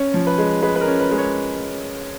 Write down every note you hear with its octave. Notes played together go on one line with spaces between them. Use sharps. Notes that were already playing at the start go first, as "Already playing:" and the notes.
Already playing: C#4 C#5
F3
B4
G#3
G#3 B4
B4
A#4
C#4
B4
G#3
C#5